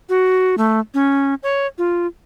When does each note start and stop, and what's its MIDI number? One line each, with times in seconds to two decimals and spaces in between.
0.09 0.55 66
0.58 0.80 57
0.94 1.35 61
1.43 1.67 73
1.78 2.07 65